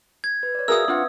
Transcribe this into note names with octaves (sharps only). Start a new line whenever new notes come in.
G#6
B4
C#5 D5
F#4 G#4 A#4 E5 F5 D#6 E6
C4 D4 F4 B4 F#5